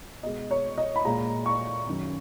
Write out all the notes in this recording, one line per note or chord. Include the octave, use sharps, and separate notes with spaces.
B2 G#3 D#5
C#5
D#5
B5
A#2 G#3 A#5
C#6
F#2 D#3 F#3